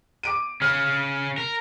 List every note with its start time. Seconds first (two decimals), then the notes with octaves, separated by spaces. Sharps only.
0.23 D6 D7 D#7
0.62 C#3 C#4 F6
1.38 A#4